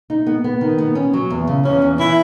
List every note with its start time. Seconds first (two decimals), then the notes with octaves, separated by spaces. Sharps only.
0.10 D#4
0.26 B3
0.44 B3
0.61 D#3
0.78 B3
0.95 C#4
1.13 F#3
1.30 E2
1.47 C#3
1.65 E2 C#4
1.82 E2
1.99 E3 E4